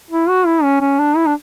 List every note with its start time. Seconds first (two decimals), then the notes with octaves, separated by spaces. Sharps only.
0.11 E4
0.29 F#4
0.46 E4
0.63 C#4
0.81 C#4
0.99 D4
1.17 E4
1.26 D4